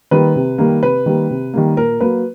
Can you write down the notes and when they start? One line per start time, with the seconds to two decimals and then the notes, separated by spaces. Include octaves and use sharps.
0.11 D#3 G3 A#3 B4
0.36 C3
0.58 D#3 G3 A#3
0.83 C3 B4
1.06 D#3 G3 A#3
1.30 C3
1.54 D#3 G3 A#3
1.77 A#2 A#4
2.00 F#3 A#3 B4